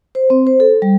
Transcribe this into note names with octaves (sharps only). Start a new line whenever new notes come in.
C5
C4
C5
A4
G3